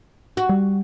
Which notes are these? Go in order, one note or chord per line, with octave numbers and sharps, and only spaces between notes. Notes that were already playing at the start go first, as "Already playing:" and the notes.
F#4
G3